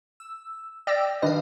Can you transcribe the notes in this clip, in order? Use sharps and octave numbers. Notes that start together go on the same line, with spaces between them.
E6
D5 G5 E6 A#6
D#3 D4 B4 D#5 F5